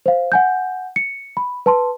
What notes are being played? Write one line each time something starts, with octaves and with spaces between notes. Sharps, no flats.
C5 F5
F#5 G#5 G6
C#7
B5
B4 A5 C6